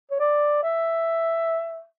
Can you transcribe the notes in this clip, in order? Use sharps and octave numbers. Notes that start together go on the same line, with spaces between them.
C#5
D5
E5